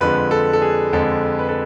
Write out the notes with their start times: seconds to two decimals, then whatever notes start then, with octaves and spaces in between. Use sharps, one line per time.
0.01 F2 D3 F3 G#3 B4
0.31 A4
0.53 A4
0.62 G#4
0.93 F2 D3 F3 G#3 A4
1.39 B4
1.49 A4